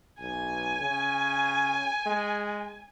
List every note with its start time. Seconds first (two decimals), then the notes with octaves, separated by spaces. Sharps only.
0.20 B1 G#5
0.81 C#3
2.06 G#3